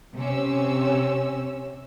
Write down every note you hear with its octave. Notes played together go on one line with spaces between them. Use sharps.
C3 C4 C#4 E6